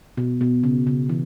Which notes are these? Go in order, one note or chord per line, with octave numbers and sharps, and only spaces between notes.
B2
B2
C#3
C#3
E3